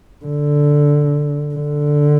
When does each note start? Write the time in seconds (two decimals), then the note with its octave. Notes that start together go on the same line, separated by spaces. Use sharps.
0.25 D3
1.55 D3